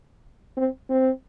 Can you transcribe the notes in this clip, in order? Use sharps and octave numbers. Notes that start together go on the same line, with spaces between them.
C4
C4